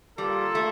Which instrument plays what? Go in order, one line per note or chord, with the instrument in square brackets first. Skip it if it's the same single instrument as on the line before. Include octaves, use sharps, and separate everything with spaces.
[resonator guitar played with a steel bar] G3 [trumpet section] A#3 F4 A4
[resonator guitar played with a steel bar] A3